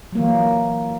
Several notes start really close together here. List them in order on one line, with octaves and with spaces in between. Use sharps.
F#3 A#3 E3